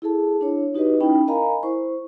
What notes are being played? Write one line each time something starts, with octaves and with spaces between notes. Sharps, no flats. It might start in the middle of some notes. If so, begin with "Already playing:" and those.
E4 G#4 A4 A5
D4 E4 C#5
D#4 F#4 G4 B4 D#5
C#4 D#4 E4 G5 B5
A#4 D#5 F5 G#5 A#5 B5
E4 C5 C#6